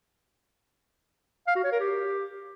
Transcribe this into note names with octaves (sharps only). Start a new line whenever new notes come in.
F5
F#4
C#5
A#4
G4